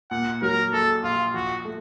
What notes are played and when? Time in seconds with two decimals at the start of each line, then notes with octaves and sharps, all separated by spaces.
0.11 A#2 F#5
0.42 F#3 A#4
0.73 A#1 A4
1.03 A#1 F4
1.34 F3 F#4
1.65 A3